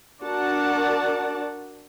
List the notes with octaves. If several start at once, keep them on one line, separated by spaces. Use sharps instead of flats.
D4 F#4 A#4 D5 F#5 A5